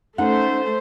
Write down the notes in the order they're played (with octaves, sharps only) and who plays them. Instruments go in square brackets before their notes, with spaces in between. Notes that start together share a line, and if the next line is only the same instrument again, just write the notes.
[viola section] A3 C5 [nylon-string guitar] C#4 D#4 F#5